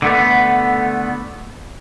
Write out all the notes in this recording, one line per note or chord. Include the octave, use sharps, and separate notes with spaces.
D3 A3 B3